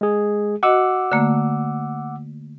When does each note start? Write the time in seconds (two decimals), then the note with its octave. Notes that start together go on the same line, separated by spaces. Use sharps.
0.01 G#3 G#4
0.63 F#4 D#5 F#5 D6 E6
1.12 D3 A3 A#3